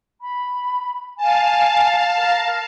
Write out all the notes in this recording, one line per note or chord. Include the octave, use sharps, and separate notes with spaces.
B5
F5 G#5 A5
A#4